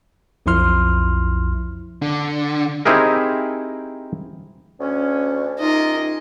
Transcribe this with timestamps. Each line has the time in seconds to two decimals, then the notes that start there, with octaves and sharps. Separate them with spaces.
0.46 B1 F2 F3 E4 C6 F6
2.02 D3
2.85 C4 D#4 E4 G4 G#4 A#4
4.80 D2 C#4
5.59 C3 C#4 D#4 F4 A#4 D#5